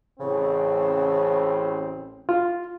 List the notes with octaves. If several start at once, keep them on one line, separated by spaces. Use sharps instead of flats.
A1 C#3 C4
F4